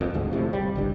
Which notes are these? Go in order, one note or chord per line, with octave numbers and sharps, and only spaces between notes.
E1 F2
D2 G#2 B2 D3
A2 C3 F3
D1 G3
G1 C#2 G2